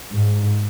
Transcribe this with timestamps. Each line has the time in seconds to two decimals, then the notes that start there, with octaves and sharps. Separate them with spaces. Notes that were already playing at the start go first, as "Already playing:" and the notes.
0.12 G#2